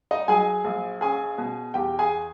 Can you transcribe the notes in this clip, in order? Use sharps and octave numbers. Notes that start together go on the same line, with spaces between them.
D#4 D#5
F#3 G#4 G#5
A#1
C#4 G#4 G#5
B2
E2 G4 G5
G#4 G#5